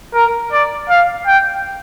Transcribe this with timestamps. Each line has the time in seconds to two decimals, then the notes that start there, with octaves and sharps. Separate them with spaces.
0.14 A#4
0.52 D5
0.89 F5
1.27 G5